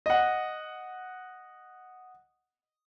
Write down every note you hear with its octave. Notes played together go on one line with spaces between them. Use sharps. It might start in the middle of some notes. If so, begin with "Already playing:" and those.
D#5 F#5